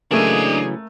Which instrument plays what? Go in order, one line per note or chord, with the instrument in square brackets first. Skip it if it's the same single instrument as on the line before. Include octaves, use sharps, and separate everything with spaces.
[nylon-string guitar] C#3 E3 F#3 [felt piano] A3 A#3 [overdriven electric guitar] D4 D#5 [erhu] G#4